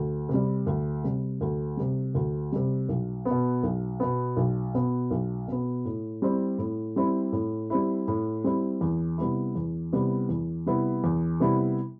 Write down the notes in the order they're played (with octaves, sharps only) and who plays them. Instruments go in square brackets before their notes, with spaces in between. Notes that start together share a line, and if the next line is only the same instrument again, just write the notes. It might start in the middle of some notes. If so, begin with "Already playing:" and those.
Already playing: [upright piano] D2
C3
G3
D2
C3 G3
D2
C3 G3
D2
C3 G3
B1
B3
B2
B1
B2 B3
B1
B2 B3
B1
B2 B3
A2
G3 C4 E4
A2
G3 C4 E4
A2
G3 C4 E4
A2
G3 C4 E4
E2
C3 G3 B3 E4
E2
C3 G3 B3 E4
E2
C3 G3 B3 E4
E2
C3 G3 B3 E4